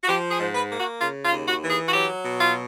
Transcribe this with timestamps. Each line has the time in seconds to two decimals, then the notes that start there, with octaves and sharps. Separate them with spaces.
0.04 F#4
0.07 F3 G4
0.31 G#4
0.39 G#2
0.55 B4
0.70 A#3
0.78 F#4
1.01 C#3 F4
1.24 F4
1.32 D#2
1.47 F#4
1.62 E3
1.70 G#4
1.87 F#4
1.93 F#3 G4
2.24 B2
2.40 F4